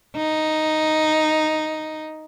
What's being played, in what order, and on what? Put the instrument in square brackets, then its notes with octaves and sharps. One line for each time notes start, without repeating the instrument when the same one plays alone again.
[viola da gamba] D#4